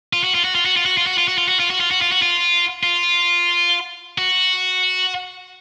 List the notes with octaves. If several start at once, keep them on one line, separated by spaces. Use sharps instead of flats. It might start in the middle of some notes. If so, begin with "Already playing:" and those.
F4
F#4
F4
F#4
F4
F#4
F4
F#4
F4
F#4
F4
F#4
F4
F#4
F4
F#4
F4
F#4
F4
F#4
F4
F4
F#4